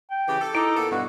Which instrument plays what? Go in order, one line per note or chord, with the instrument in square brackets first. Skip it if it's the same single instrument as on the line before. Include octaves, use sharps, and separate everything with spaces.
[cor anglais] G5
[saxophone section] C#3 E3 G4
A4
[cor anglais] D#4 [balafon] E4 D6
[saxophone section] A#2 B3 A4
[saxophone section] G2 B2 [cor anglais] F#4